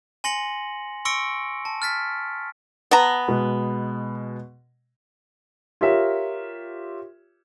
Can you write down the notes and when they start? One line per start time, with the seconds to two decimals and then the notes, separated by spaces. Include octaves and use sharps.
0.24 G#5 C6 A#6 C#7 F#7
1.05 C6 C#6 E6 A#6 C#7 D7
1.65 A5
1.82 F6 A6 B6
2.91 B3 A5 A#5
3.28 B2 G#3
5.81 F4 G4 A#4 C#5 E5